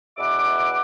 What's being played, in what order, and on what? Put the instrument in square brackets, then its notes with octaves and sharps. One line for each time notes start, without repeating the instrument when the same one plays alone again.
[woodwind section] E2 B2 E5 F#5 D6